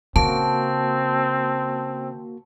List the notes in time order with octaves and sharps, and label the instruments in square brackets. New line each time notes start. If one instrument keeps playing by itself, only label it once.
[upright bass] C#3 [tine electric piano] A#3 F#4 [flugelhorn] C4 [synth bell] A5